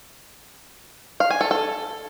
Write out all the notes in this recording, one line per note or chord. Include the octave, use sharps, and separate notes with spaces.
F5
G#5
A4
A4